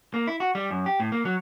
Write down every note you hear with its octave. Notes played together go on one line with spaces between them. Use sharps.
A#3
E4
F#4
G3
F#2
G4
A2
A#3
F#3